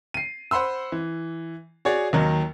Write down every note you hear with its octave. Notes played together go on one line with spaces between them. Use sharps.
C7 D#7
C5 F#5 B5 C6 E6
E3
F#4 G#4 C#5 D5
D#2 D#3 F#3